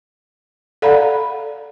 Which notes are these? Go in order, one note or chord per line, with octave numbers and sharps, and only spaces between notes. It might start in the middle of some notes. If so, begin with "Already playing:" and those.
A4 D5 F5 F#5 A#5 B5